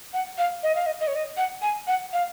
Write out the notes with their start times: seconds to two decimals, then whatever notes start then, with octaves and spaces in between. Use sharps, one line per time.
0.13 F#5
0.38 F5
0.63 D#5
0.75 F5
0.86 D#5
1.00 D#5
1.08 C#5
1.16 D#5
1.37 F#5
1.62 G#5
1.87 F#5
2.13 F5